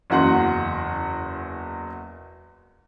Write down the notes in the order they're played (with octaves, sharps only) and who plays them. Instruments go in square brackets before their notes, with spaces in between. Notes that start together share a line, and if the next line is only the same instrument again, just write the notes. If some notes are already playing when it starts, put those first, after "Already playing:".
[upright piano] F#1 E2 F#4 F#5 C6